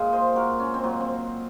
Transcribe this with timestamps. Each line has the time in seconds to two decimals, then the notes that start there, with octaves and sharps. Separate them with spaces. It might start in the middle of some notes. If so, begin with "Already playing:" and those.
Already playing: A#2 G#3 F5
0.12 C5 D#5
0.36 F#4 A#4
0.60 C#4
0.74 C4
0.84 A#2 F#3
1.00 C4